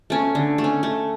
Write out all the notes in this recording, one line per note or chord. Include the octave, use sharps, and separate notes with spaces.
A3 C#4
D3
A3
C#4
A3